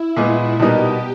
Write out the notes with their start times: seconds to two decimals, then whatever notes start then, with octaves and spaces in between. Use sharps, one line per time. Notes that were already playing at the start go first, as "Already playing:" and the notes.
Already playing: E4
0.16 A#2 G#3 B3
0.60 B2 G3 B3 D#4 G4 A#4